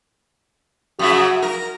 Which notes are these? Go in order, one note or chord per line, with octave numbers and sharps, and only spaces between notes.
F#2 C#3 F#4 E5
A#4